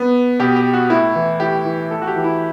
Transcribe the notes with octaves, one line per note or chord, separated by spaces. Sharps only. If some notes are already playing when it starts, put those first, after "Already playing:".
Already playing: B3
B2 G4
G4
F#4
A2 E4
E3
A2 G4
E3
A2 A4
F#4
G4
E3
E4